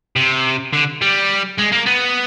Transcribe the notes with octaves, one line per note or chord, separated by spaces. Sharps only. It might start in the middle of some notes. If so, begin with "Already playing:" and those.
C3
D3
G3
G#3
A#3
B3